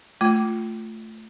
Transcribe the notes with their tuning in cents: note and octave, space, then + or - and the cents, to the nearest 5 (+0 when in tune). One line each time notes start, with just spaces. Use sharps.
A3 +0 F4 +0